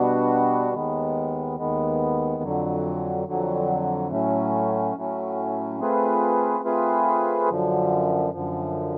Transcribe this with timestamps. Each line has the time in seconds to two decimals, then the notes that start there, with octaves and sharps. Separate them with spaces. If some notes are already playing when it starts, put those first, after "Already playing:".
Already playing: B2 G3 B3 D4 F#4
0.74 D#2 D#3 G#3 B3
1.58 D#2 D#3 G#3 B3
2.43 F2 D3 F#3
3.27 F2 D3 F#3
4.11 A2 F#3 A3 C#4
4.95 A2 F#3 A3 C#4
5.80 A3 C4 F4 G#4 B4
6.64 A3 C4 F4 G#4 B4
7.49 F#2 D3 F3
8.33 F#2 D3 F3